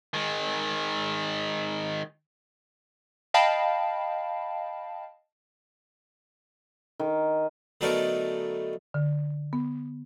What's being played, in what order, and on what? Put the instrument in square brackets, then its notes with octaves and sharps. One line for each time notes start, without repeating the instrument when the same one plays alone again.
[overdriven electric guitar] D#3 G#3
[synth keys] D#5 F5 G5 A5 B5
[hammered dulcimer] D#3
[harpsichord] D3 F#3 A3 B3 D#4 A#4
[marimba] D3
B3